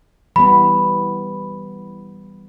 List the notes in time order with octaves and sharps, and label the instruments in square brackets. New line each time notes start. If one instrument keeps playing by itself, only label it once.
[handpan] E3 G3 B3 [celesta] B5